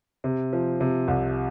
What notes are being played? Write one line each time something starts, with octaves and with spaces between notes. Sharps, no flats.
C3
F3
C3
C2